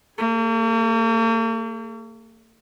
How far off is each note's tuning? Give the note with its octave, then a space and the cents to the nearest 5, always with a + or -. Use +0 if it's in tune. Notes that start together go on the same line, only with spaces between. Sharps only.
A#3 -45 G#4 +0